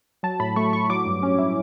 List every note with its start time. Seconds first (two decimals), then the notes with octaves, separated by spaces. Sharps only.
0.23 F#3 A5
0.40 A2 B5
0.56 A3 C#6
0.72 A2 C#6
0.90 F#3 D6
1.06 G2
1.23 C#4
1.39 E4